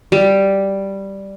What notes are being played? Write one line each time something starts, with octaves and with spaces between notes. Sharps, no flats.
G3